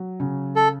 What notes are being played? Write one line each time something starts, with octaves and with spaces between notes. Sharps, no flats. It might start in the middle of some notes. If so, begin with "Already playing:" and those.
Already playing: F#3
C#3
A4